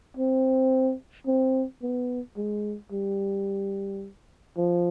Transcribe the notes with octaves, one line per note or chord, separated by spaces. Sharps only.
C4
C4
B3
G#3
G3
F3